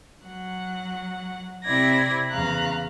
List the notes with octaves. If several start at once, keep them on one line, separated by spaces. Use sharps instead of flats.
F#3 F#5
C3 C4 E4 D5 G#6 A#6
E2 C#3 F5 A#5 F#6